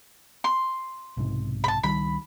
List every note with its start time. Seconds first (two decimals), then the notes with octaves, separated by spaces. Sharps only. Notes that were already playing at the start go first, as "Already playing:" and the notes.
0.44 C6
1.17 B1 G#2 C3
1.64 A5 B5
1.83 C#2 D#3 G3 B5